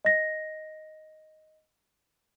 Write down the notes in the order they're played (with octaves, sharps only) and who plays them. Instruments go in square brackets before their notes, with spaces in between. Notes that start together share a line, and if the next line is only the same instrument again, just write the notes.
[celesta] D#5 A#6